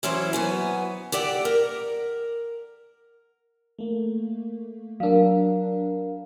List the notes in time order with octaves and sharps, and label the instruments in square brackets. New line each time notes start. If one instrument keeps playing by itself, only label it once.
[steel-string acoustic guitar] E3 F#3 C#4 E4 C5 C#5
F#3 B3 G#5
G4 A4 D5 F#5 G5
A#4
[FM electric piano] A3 A#3
[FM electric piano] F#3 D4 [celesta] A#4 F5